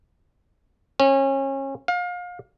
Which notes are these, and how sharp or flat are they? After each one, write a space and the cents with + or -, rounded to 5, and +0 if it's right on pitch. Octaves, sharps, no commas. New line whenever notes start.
C#4 -30
F5 +30